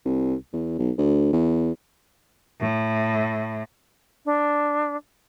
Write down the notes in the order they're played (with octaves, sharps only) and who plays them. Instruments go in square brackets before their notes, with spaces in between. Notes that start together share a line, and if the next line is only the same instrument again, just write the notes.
[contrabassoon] C2
E2
B1
D2
E2
[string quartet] A2
[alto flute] D4